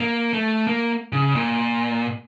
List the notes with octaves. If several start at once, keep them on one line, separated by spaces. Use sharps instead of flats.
A#3
A3
A#3
C#3
A#2